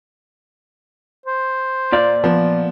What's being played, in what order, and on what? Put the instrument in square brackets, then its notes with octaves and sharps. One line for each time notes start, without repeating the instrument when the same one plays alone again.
[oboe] C5
[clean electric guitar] A#2 D5 [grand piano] F4
[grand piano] F3 B3